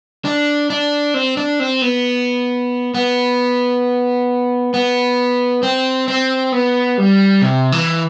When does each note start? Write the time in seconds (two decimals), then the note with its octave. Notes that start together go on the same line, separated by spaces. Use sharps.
0.25 D4
0.70 D4
1.14 C4
1.37 D4
1.60 C4
1.82 B3
2.94 B3
4.74 B3
5.63 C4
6.08 C4
6.52 B3
6.98 G3
7.42 C3
7.72 E3